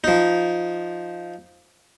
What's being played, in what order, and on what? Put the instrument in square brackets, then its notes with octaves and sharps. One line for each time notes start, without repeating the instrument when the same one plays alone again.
[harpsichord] F3 D#4